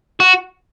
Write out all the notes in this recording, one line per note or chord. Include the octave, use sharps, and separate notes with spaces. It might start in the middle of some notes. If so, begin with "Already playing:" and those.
F#4